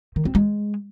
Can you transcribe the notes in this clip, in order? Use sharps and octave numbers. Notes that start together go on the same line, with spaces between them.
D#3
C4
G#3